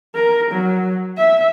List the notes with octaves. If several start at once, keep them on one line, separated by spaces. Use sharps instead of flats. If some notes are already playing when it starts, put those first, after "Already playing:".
A#4
F#3
E5